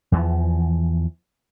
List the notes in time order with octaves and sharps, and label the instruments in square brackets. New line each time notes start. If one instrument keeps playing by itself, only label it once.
[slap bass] E2 E3 F3